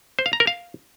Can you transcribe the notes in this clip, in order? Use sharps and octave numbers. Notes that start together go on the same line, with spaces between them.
C5
F5
A#5
A#4
F5